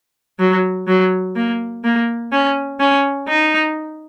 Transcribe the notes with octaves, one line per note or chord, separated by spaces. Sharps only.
F#3
F#3
A#3
A#3
C#4
C#4
D#4